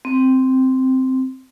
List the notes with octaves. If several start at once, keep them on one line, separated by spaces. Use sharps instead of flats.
C4